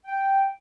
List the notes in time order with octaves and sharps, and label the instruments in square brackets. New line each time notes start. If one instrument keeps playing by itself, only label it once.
[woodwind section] G5